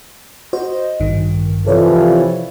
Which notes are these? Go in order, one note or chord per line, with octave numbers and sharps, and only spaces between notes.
F#4 C5 D#5
A1 G2 D#3
C3 E3 F3 A4 C#5 D5